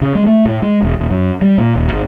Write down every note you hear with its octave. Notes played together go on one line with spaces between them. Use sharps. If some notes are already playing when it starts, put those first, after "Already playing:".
C#3
G#3
A3
A2
G#3
E1
D#1
F#2
G3
A#2
D#1
G#1